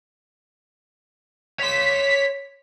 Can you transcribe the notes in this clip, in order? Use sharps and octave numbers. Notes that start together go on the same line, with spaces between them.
C#5 C6 B6